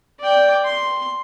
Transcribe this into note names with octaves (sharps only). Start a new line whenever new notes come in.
D5 G5
C6